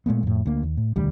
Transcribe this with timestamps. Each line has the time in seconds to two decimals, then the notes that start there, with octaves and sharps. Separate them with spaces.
0.06 A#2 G#3 A3 B3
0.23 F2 A2
0.46 D2 A#3
0.63 D#2
0.77 A2
0.96 E1 D2 D#3 G3